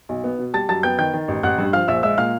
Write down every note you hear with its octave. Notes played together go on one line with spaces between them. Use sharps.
B1
B3
B2
G3 A5 A6
F#2 A5 A6
B3 G5 G6
D#3 G5 G6
D#3
A1
A1 F#5 F#6
G2
F3 F5 F6
A#1 E5 E6
G#3 E5 E6
A#2 F5 F6